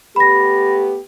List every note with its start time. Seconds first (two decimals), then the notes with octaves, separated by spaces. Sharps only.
0.16 A3 B3 G4 B5 A#6